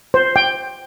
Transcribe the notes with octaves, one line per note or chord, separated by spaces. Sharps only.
C5
G5